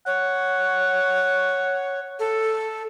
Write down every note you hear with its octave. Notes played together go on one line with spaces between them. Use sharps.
C#5 F#5
A4